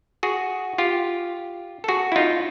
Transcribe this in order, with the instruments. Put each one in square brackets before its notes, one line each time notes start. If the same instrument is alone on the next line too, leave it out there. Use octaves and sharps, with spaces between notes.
[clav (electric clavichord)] F#4 G#4
F4 G4
A4
F#4 G#4
E4
D#4 F4